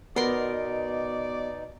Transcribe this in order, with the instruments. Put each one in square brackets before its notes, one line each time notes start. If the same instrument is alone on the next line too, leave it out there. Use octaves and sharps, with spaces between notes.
[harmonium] B2 D#4 [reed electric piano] B3 F#4 [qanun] A#4 C6 [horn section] D5